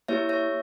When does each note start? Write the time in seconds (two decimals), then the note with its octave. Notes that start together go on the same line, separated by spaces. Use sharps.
0.08 A#3 E4 G4 C#5 E5
0.29 C#5 E5